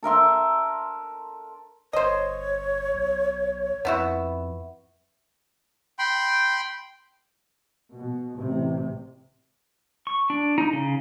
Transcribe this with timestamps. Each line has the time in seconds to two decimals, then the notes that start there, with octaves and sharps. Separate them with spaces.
0.03 A4 A#4 E5 C6
1.93 G1 C5 C#5 D#5
2.94 B1
3.85 F2 B3 E4 F#4
5.99 G5 B5 C6
7.95 B2
8.35 A1 C3
10.07 C#6
10.30 D4
10.58 D#4
10.73 C#3